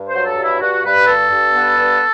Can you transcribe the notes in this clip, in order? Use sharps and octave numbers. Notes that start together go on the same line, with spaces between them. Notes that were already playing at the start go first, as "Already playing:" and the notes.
Already playing: G2
C5
F#3
A4
G2
E4
G2 F#4
G2 B4
G2 A4
G2
B3
G2